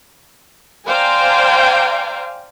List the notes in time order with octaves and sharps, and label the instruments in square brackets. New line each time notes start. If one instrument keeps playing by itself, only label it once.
[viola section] C5 D5 F5 G5 G#5 A#5